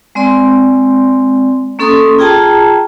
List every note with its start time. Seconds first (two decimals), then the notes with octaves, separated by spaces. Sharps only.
0.15 G#3 C4 D5 C6
1.79 A#3 C#4 A4 C6 D#6
2.19 F4 G#4 G5 A5 A#5